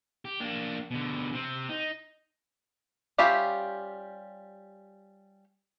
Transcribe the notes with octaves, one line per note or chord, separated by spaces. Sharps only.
G4
A#3 D4
B2 D3
C3 C4
D#4
G3 C#4 F4 G4 E5